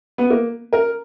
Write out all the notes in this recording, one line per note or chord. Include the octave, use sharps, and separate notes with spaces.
B3
A#3
A#4